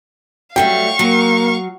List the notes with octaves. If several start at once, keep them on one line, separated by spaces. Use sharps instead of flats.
F#3 G3 A3 F5 G5 C#6
F#3 A#3